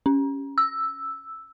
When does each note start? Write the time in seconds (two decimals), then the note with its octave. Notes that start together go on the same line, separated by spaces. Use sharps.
0.06 C#4
0.58 E6